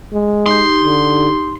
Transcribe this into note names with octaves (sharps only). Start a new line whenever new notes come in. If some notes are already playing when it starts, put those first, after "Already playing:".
G#3
D#4 G4 C6
D3